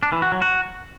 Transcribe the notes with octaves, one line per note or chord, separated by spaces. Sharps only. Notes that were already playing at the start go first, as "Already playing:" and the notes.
D4
E3
F#4
F#3
F#4